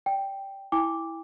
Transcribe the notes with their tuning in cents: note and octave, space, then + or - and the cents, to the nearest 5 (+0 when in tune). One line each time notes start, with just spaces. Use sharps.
D5 -20 G5 +0
E4 -5 G5 +45 D6 -5